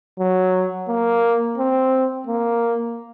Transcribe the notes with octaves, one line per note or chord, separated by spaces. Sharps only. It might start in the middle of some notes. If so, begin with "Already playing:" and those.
F#3
A#3
C4
A#3